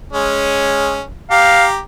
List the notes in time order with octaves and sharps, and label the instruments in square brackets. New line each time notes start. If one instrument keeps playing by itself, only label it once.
[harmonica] G#3 C#4
[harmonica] G4 A#5 [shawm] F5